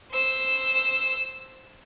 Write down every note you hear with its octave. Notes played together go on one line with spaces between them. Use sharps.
C5 E6